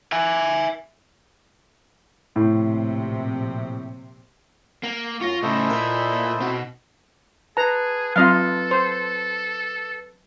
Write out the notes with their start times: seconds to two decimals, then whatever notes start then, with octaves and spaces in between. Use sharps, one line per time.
0.12 E5 G#5
2.36 A#1 A2 C3
4.83 A#3
5.21 F#2 F4 C#6 A#6
5.43 A2 C#3 E4 A4 C5 D#5 E5
5.70 A#2 A#3 A#4
6.40 B2 C4 D#4 F#4
7.57 G#4 B4 A5 A#5
8.16 F#3 C4 F4 A4 D#5 F5
8.71 C5